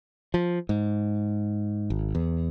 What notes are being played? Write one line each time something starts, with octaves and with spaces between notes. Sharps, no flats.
F3
G#2
G#1
E2